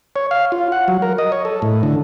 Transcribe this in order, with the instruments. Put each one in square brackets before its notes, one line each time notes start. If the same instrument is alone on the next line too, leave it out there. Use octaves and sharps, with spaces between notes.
[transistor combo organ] C#5
F5
F4
F#5
F#3
A#4
D#5
C#5
A4
A2
D3